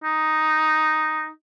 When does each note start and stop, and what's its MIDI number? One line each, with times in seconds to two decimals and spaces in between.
0.04 1.29 63